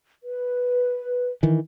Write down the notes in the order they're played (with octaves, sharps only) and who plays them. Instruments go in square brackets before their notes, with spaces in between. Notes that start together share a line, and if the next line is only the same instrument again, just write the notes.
[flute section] B4
[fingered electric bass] D#3 E3